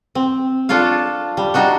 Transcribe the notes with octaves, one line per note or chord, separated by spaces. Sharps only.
C4
D4 F4 A4 C#5 F5
G3
G3 D4 D#4 F#4